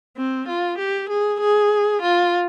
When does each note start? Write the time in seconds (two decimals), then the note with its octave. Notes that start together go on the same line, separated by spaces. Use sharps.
0.17 C4
0.48 F4
0.79 G4
1.09 G#4
1.40 G#4
2.02 F4